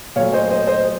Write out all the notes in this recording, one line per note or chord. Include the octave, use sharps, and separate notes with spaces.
A#2 F#3 A3 C#5 F5
C5 D#5
C5 D#5
C5 D#5